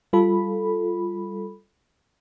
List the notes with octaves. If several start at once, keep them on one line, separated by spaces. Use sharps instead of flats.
G3 F4 A4 B5